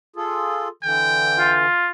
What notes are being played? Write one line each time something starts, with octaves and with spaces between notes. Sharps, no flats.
F4 G#4 A4
D3 E3 G5
F4